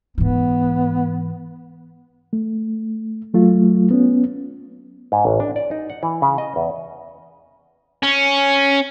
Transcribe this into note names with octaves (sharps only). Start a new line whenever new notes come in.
G#2 E3 B3
A3
F#3 A3 F4
B3 C#4
G#2
A1
D4
D5
D#4
F#5
E3
C#3
D#5
E2
C#4